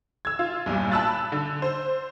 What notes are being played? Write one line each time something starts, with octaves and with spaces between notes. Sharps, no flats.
E6 G#6
F4
B1 E2 G2 A#2
A5 B5 E6 F#6 A6
D3
C5